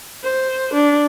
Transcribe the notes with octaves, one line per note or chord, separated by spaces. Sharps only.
C5
D4